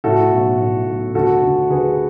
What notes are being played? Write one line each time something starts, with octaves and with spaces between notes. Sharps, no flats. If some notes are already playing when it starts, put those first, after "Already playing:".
A2 F#4 A4
B1
A2
B1
D2 F#4 A4
D2
D2 G#4 B4